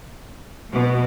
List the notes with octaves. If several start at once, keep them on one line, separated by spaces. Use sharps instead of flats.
B2